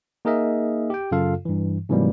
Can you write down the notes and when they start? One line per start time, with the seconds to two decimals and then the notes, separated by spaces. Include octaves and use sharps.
0.25 A#3 D#4 G#4 A#4 D#5 E5
0.90 G4 G5
1.11 F#2 C#3 F4 A4 F5
1.45 G2 E3
1.89 G#2 C3 E3 F#3 G3 A#3